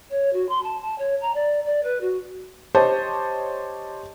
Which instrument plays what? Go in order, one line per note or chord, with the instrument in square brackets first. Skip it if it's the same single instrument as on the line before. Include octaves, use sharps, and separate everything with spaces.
[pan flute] C#5
F#4
C6
A5
A5
C#5
A#5
D5
D5
B4
F#4
[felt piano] G4 C5 C#5 D#5 A5